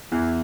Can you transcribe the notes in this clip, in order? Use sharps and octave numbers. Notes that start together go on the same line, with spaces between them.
E2 E3